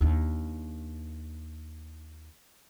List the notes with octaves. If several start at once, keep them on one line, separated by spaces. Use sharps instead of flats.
D#2 D4